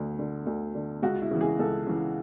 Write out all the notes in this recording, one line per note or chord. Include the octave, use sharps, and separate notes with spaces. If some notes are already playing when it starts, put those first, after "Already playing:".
Already playing: D2 D3
D3
D2
D3
C#2 F#4
E4
C#3 E3
G#4
C#2 A4
C#3 E3